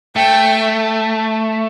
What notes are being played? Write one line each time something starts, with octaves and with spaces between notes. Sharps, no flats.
A3 G5